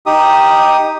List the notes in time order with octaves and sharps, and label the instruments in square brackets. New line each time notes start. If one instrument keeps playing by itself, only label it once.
[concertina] D#4 G4 D#6